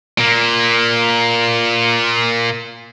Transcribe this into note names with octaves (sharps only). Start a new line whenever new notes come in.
A#2 A#3